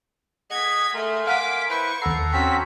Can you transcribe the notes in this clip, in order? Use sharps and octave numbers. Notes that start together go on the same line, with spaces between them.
G#4 D#5 F#5 G#6 B6
A3 A#4 G#5 C6
F5 F#5 D6 B6 D#7
E4 B4 C5 C#6
D#2 A4 F#5 A#5 C7
C4 C#4 F#4 B6